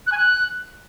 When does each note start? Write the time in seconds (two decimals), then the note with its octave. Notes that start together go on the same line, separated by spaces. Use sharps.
0.06 F#6
0.12 G#5
0.17 F#6